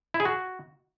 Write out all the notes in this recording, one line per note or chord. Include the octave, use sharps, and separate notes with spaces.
E4
G#4
F#4